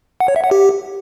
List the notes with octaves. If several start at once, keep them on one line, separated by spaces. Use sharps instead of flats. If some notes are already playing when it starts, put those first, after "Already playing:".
F#5
C#5
E5
F#5
G4